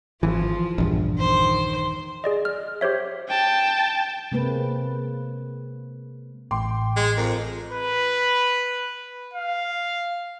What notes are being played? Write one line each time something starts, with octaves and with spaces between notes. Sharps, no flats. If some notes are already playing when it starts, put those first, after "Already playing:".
G#1 E3 F3
A#1 E2 G2
D#3 C5
G#4 D5 D#5
F6
G4 C5 C#5 E5
G5 A5
C3 G#3 A#3 C4 B4
A1 A2 G5 C6 D6
G#3
F2 A#4
B4
F5